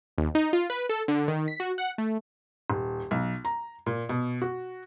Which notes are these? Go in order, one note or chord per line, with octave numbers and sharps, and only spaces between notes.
D#2
D#4
F4
B4
A4
D3
D#3
B6
F#4
F#5
A3
D#1
B1
A#5
A#2
B2
F#4